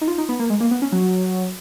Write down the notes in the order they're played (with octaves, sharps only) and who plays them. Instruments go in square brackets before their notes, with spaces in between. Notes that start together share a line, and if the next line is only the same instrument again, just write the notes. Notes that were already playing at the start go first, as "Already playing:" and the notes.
[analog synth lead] D#4
F4
D#4
B3
A#3
G#3
A#3
B3
C#4
F#3